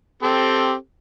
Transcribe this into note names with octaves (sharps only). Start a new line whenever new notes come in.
C4 G4 A4